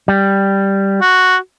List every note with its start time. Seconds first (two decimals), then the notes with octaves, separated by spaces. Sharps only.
0.08 G3
1.01 F#4